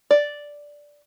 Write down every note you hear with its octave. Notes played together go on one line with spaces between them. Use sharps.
D5